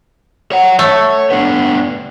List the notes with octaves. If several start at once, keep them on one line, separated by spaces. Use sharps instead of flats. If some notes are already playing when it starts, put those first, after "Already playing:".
C#5 F#5
A3 C#5
B3 D4